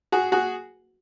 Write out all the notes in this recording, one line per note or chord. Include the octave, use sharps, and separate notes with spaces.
F#4 G#4
F#4 G#4